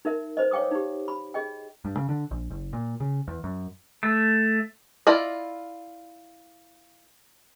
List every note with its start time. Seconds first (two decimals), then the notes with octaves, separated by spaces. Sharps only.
0.05 D#4 A#4 E5
0.37 B4 C5 D#5
0.51 C#5 F5 G5 D6 D#6
0.71 D#4 G4
1.08 B5
1.34 G#4 D#5 G5
1.85 G2
1.97 C#3
2.09 D3
2.31 A#1
2.50 F#1
2.73 A#2
3.00 C#3
3.28 E2
3.44 F#2
4.03 A3
5.07 E4 F4 D5 D#5